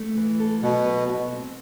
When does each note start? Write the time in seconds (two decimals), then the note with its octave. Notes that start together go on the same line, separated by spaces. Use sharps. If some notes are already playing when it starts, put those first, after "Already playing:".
Already playing: A3
0.17 E3
0.40 A4
0.63 B2 F#3
0.86 B4
1.09 F#4
1.32 C4